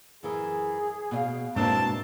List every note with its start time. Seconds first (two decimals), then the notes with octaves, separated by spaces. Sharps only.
0.23 F#2 E3 G#4 A#4
1.11 B2 D#5 F5
1.56 G#2 B2 A#3 C4 D4 E4 A#4 A5